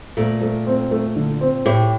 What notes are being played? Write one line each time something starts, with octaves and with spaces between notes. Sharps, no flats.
A#2 A3
A3
C4
A3
D3
C4
A2 G4